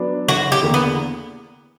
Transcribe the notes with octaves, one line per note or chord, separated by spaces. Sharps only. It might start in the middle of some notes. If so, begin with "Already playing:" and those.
Already playing: F#3 B3 D4
F#1 F#4
G4
E2 D3 A#3
B3